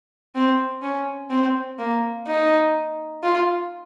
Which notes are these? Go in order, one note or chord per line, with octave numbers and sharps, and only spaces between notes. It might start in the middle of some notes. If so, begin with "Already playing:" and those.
C4
C#4
C4
A#3
D#4
F4